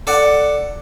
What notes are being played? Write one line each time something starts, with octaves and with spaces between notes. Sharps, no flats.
A4 D5 F#5